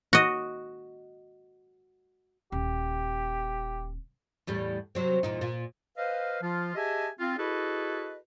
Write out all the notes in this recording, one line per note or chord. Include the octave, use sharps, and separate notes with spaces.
F#4 D#5
D#1 G4
E2 A2 G3
C3 F#3 C4
E2 A#2 D#4
A#2 A#3
B4 C5 D#5 F5
F3 F4
G4 G#4 D#5 E5 G#5 A5
C4 F4
E4 F#4 G#4 A4 B4 D#5